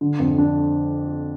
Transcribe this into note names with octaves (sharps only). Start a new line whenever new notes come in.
D3
F2
D4